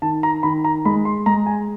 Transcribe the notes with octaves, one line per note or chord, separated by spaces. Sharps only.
D#3 A5
A#5
D#3 B5
A#5
G#3 B5
C6
G#3 A#5
G#5